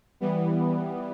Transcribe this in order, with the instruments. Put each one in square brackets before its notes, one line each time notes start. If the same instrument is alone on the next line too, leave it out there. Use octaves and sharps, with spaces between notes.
[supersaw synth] E3 G3 B3